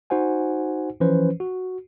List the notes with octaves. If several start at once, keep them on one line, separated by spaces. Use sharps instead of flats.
D#4 F#4 C5 F#5 G#5
E3 F3 C#4 B4 C5
F#4